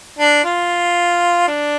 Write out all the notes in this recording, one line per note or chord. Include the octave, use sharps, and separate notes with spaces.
D4
F4
D4